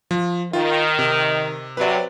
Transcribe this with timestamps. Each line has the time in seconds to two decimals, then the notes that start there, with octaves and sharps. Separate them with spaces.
0.11 F3
0.53 D#3 F4
0.99 C3
1.77 C3 F#3 B4 D5